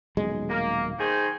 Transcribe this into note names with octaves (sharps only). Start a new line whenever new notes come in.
D#1 B1 G#3
A#3
D#3 G#4 C5